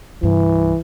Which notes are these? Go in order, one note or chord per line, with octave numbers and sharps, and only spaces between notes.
C2 G2 E3